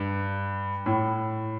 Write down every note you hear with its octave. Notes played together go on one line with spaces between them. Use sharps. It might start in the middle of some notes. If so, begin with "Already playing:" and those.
Already playing: G2
A2